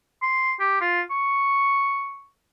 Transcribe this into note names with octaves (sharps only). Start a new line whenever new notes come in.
C6
G4
F4
C#6